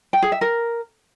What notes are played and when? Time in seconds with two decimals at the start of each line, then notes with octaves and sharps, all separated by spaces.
0.13 G5
0.22 G#4
0.32 E5
0.41 A#4